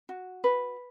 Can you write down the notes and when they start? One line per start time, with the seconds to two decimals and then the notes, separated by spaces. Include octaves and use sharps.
0.09 F#4
0.44 B4